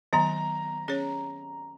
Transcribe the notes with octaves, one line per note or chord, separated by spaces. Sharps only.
D#3 F#3 B3 A#5
C#4 G#4 C#5